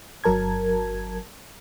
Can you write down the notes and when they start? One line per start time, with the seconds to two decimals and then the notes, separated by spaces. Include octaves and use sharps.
0.24 G1 F#3 A#4 A5 G#6